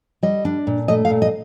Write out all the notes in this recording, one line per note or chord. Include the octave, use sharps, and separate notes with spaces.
G3 D#5
D4
A#2
A3 D#5
F5
A#2
D#5